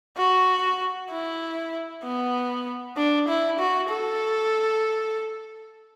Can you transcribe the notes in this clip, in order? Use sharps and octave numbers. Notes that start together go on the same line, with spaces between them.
F#4
E4
B3
D4
E4
F#4
A4